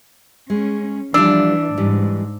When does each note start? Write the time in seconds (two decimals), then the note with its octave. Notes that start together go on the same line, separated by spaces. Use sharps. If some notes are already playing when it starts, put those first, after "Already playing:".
0.50 G#3 C#4
1.14 E3 F3 G3 D4 D5 E6
1.77 G#2 E3 G3